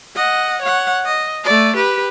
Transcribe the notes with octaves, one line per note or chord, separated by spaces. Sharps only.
D#5 F#5
C#5 F#5
D#5
A3 D5
G4 B4